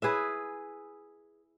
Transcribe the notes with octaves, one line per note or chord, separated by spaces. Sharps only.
E4 G#4 B4 E5